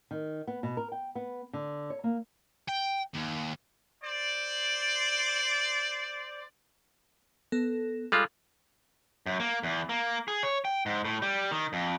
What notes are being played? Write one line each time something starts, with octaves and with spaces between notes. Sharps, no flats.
D#3
B3
B2
A#4
G5
B3
D3
C#5
A#3
G5
D#2
C5 D5
B3 A4 A#6
G3 G#3 F4 A4 F5
F#2
A#3
E2
A#3
G#4
C#5
G5
G#2
A2
G3
D#3
F2